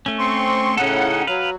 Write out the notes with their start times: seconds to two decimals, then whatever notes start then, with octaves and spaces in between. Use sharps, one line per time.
0.06 A3 C#4
0.19 C4 C6 C#6
0.77 A2 C#3 C#4 D#4 A4 F#5
1.27 F#3 B4 F5